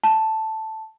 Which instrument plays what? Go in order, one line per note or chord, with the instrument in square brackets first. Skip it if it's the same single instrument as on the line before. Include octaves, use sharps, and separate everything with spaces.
[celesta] A5